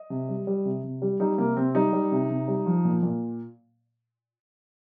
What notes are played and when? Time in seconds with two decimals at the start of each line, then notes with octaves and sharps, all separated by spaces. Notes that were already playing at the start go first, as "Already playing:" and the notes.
Already playing: D#5
0.10 C3
0.29 G3
0.47 G3
0.65 C3
0.84 C3
1.02 G3
1.20 G3 D#4
1.38 C3 A#3
1.57 C3 C4
1.75 G3 D#4
1.93 G3
2.12 C3
2.30 C3
2.48 G3
2.66 F3
2.85 A#2
3.03 A#2